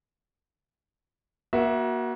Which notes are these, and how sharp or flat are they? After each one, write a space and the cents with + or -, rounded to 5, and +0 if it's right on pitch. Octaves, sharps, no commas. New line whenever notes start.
A#3 +35 F#4 +0 E5 +0